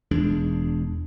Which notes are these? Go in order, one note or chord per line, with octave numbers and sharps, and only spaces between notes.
E1 E2 G#3 D4